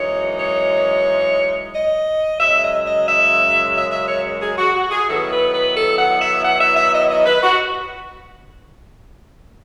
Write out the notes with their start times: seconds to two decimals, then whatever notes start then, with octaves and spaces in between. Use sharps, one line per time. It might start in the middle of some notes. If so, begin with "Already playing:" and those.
Already playing: F#2 E3 G#3 D#4 C#5
0.39 C#5
1.73 D#5
2.39 F#2 C#3 G#3 E5
2.62 D#5
2.84 D#5
3.07 E5
3.74 E5
3.90 E5
4.07 C#5
4.41 G#4
4.58 F#4
4.74 F#4
4.91 G#4
5.07 D#3 F#3 B3 E4 A4
5.30 B4
5.53 B4
5.75 A4
5.97 F#5
6.19 E5
6.42 F#5
6.58 E5
6.75 E5
6.93 D#5
7.09 D#5
7.26 B4
7.42 F#4